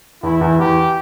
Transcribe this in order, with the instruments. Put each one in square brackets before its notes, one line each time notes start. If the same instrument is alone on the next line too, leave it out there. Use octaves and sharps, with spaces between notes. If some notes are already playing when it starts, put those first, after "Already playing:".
[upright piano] E2 [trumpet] E4
[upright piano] E2
[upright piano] E2 [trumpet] G4